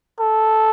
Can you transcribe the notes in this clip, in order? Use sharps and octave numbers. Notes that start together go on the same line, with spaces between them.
A4